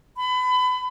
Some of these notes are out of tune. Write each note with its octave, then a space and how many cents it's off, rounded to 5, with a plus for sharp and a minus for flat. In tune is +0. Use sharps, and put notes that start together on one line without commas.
B5 +30